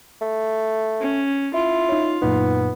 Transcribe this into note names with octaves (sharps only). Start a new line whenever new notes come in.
A3
C#4
E4 F4 C6
D#4 C#5
F#2 A#2 B3 D#4